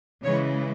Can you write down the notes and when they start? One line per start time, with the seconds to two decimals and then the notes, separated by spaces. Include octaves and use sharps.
0.24 C#3 E3 G#3 C#5